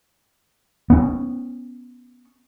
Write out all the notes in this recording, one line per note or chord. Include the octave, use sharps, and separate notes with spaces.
B3 C#4